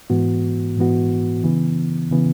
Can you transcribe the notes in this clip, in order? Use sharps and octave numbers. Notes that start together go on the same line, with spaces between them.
G#2 E3 B3 F#4
G#2 E3 B3 F#4
C#3 E3 B3
C#3 E3 B3